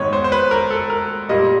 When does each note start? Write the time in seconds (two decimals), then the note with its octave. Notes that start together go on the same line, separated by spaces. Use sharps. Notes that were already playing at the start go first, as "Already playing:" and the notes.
Already playing: G#2 D#3 G#3 B3 C#5
0.13 C5
0.24 C5
0.32 B4
0.51 A#4
0.71 A4
0.90 A#4
1.29 A#2 G3 A#3 D#5